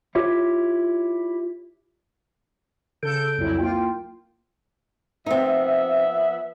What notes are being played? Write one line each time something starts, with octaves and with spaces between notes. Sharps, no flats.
E4 F4 G4 C#5
C#3 A4 G6 D7
C2 F2 F#3 E4
A#3 F4 G5
F3 B3 C4 D#4 E5